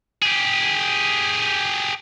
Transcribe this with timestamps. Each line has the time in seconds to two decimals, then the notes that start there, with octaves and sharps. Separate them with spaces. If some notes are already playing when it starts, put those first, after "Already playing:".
0.22 G4 G#4